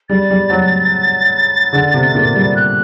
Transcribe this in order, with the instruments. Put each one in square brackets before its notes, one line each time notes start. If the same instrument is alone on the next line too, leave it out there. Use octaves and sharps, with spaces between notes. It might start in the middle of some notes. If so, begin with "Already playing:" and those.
[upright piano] G3 [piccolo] A6
[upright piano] G3
F#3
D3
C3
A#2
G3
[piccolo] F#6